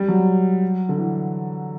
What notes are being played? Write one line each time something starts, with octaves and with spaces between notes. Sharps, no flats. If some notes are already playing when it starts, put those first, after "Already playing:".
Already playing: G3
F#3
D3
E3